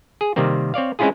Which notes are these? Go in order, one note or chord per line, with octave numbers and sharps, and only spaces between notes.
G#4
C3 D#3 G3 A#3 C4
C4 C#5 D5 F5
G#3 C4 C#4 E4 F4 G#4